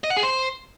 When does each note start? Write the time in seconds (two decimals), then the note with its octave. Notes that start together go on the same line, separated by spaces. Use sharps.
0.04 D#5
0.10 F#5
0.17 G#4
0.23 C5